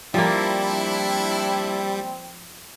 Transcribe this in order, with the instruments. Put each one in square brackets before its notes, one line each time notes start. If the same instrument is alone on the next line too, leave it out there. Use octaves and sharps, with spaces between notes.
[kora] F3 A#3 [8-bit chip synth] G3 [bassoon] C4 [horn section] D4 E4